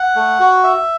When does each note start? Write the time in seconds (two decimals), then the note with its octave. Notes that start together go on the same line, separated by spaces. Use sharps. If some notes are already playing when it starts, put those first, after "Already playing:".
Already playing: F#5
0.16 A3
0.40 F#4
0.64 E5